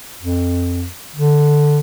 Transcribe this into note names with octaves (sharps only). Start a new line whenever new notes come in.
F2
D3